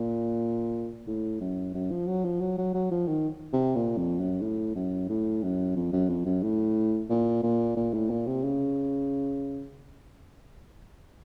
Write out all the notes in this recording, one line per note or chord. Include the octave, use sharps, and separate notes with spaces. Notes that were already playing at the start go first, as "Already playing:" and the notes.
Already playing: A#2
A2
F#2
F#2
F3
F#3
F3
F#3
F#3
F#3
F3
D#3
C3
A#2
F2
F#2
A2
F#2
A2
F#2
F2
F#2
F2
F#2
A2
A#2
A#2
A#2
A2
A#2
C3
C#3